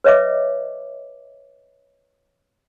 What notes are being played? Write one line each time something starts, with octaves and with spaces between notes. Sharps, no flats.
B4 C#5 D#5 E5 D6